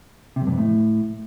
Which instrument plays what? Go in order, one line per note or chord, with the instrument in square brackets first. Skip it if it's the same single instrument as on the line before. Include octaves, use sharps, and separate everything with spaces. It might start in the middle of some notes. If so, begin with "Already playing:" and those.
[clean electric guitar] C3
F#2
G2
F2
A2